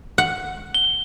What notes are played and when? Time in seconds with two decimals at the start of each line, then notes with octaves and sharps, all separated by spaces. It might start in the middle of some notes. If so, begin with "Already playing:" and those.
0.18 F#5
0.74 G7